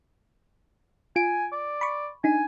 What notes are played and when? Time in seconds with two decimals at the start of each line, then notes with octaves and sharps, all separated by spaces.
1.16 F4 G#5 D7
1.52 D5
1.81 B5 C#6
2.24 D4 D#4 G#5